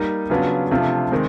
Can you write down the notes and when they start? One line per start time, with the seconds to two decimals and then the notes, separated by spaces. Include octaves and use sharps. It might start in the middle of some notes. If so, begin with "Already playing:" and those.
Already playing: G3 A#3 D#4
0.30 C#3 F#3 B3 D4 F4
0.71 C3 F3 A3 D4 F4
1.12 D#3 G#3 C4